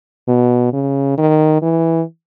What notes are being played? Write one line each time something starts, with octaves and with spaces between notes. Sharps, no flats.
B2
C#3
D#3
E3